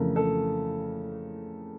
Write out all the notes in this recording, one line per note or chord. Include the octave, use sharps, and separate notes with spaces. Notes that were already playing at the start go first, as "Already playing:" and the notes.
Already playing: F2 C#3 E3 A3 A#4
A4